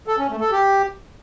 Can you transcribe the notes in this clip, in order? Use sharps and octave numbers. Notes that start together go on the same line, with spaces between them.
A4
C#4
A3
A4
G4